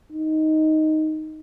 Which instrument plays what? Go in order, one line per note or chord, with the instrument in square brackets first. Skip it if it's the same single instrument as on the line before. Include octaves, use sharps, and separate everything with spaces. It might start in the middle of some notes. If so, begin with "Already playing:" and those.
[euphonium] D#4